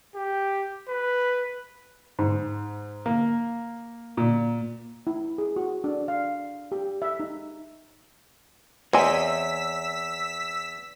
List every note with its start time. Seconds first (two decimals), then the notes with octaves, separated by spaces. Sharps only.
0.15 G4
0.88 B4
2.19 G#2
3.06 A#3
4.17 A#2
5.07 E4
5.38 G#4
5.56 F#4
5.84 D4
6.08 F5
6.72 G4
7.02 E5
7.20 D#4
8.93 E2 C4 C#5 D#5 G#5 E6 B6